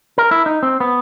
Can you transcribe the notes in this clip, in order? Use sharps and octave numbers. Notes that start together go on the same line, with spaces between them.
A#4
E4
D#4
C4
B3